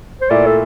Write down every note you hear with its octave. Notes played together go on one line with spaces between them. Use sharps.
C5
A#2 A3 E4 D5
A4